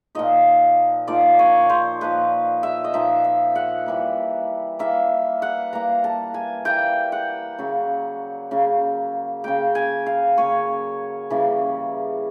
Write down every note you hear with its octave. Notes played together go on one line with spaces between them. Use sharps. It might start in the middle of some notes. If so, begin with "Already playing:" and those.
A#2 F3 A#3 D#4 D#5
A#2 F3 A#3 D#4 D5
C#5
C5
A#2 F3 A#3 D#4 B4
E5
D#5
A#2 F3 A#3 D#4 E5
E5
F#5
E3 G3 A#3
E3 G3 A#3 E5
F#5
E3 G3 A#3 A#5
A5
G#5
E3 G3 A#3 G5
F#5
C#3 F#3 A#3
C#3 F#3 A#3
C#3 F#3 A#3 G5
G#5
F5
C#3 F#3 A#3 C#5
C#3 E3 G3 A#3